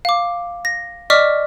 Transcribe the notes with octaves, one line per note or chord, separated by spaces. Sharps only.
F5 D6
A#6
D5 D#5 C#6 D6 F6 B6